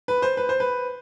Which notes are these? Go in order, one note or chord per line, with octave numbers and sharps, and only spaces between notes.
B4
C5
B4
C5
B4